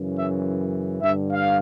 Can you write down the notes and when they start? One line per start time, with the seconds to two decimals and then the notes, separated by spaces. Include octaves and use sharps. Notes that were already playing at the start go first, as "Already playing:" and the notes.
Already playing: F#2 C#3 E3
0.17 E5
1.02 G2 D3 E5
1.31 F5